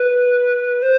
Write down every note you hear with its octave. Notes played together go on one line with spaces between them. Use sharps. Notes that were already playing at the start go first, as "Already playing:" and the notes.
Already playing: B4
C5